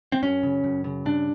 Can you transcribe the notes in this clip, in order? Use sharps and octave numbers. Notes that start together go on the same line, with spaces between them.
C4
F#2 C#4
C#3
F#2
C#3
G2 D4